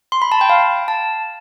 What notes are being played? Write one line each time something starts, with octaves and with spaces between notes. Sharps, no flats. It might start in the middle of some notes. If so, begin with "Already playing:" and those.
C6
B5
A5
G5
F5
A5